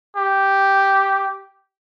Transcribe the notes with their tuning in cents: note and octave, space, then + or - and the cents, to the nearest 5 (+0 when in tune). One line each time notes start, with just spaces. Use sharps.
G4 -5